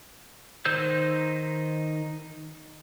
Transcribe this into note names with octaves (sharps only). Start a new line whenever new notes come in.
D#3 D#4 C5 E6 G6